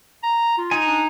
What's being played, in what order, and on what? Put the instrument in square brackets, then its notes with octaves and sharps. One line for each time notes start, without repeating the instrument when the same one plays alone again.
[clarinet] A#5
F4
[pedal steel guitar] D#4 G#5
[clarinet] D4